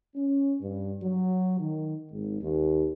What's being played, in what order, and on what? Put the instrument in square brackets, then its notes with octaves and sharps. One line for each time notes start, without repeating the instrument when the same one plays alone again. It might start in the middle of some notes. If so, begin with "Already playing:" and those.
[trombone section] C#4
G2
F#3
D#3
G#1
D#2